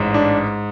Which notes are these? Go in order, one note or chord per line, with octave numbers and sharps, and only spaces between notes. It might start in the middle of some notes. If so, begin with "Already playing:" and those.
Already playing: A1 G#2
D4